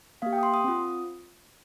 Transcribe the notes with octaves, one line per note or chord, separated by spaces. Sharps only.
A#3 G4 F5
G5
D#6
C6
D#6
C4 F4